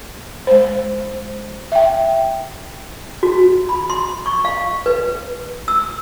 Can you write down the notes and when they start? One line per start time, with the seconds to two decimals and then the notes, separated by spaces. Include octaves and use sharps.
0.47 G#3 C5
1.72 E5 G5
3.23 F#4
3.69 B5
3.90 C6
4.26 C#6
4.45 F5
4.86 B4
5.68 E6